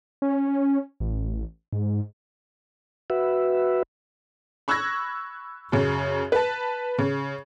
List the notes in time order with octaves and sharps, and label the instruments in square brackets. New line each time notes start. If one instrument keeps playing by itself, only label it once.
[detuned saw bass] C#4
A1
G#2
[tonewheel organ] F#4 B4 E5
[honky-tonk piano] B5 C#6 E6 F#6 G#6 A#6
F#2 C#3
B4 A5
C#3